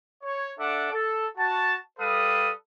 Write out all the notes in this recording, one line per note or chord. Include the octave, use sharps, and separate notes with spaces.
C#5
D4 A4 E5 F#5 D6
A4
F#4 A5
G3 A4 B4 F5 D#6